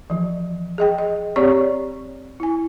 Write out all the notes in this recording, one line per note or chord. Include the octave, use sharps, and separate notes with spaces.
E3 F3
G#4 D#5 G5
D#5
C4 G4 C#5 D5 C#6
E4 G#5